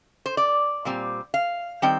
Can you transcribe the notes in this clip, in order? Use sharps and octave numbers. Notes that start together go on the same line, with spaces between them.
C5
D5
A#2 G3 C4
F5
D#3 G3 C4 G5